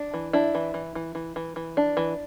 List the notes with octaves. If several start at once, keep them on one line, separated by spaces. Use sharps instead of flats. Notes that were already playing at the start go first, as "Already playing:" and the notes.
Already playing: D4
E3
D4 E4
E3
E3
E3
E3
E3
E3
D4
E3